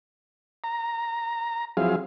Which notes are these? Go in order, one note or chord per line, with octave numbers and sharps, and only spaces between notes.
A#5
F3 F#3 C4 E4 G#4 F5